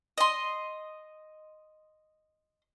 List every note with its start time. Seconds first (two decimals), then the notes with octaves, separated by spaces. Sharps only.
0.18 D#5 C6